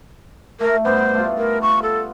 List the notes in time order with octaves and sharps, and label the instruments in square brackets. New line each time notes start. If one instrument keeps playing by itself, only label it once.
[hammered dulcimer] A3 [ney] A#4
[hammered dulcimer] G2 B3 [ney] C5
[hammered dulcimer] A3 F4
[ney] A#4
C#6
A4